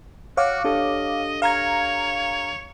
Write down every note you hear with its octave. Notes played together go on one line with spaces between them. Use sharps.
F#4 C#5 F5 F#5 D6
D4 G4 A4 D#5
C#5 F5 A#5 G#6